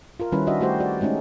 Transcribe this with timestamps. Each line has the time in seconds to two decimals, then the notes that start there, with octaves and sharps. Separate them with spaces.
0.20 F4 A#4
0.32 D#3 G3 C#4 E4 B4
0.47 D4 F#4 D#5 E5
0.61 A3 F#4 G4 C5
0.80 F#4 D5
1.01 G#3 A3 C#4 D#4